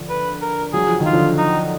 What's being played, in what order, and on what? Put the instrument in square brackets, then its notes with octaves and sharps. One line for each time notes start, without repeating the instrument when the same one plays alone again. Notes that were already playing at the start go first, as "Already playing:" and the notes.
Already playing: [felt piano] D3 F3
[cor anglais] B4
A#4
[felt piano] F#3 [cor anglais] G#4
[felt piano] F3
D#3
[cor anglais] F4
[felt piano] D3 F3
[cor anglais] D#4